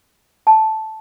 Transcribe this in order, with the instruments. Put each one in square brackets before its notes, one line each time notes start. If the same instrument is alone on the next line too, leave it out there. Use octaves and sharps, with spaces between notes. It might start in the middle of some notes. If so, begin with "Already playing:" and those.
[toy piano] A5